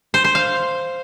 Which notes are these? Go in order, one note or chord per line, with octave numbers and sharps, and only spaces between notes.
C5
C5
F5